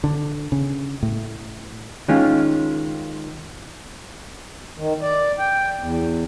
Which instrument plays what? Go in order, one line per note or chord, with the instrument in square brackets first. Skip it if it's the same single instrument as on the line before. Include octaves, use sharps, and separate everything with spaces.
[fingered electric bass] D3
C#3
A2
[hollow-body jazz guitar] D#3 G#3 C#4 F4
[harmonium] D#3
D5
G5
E2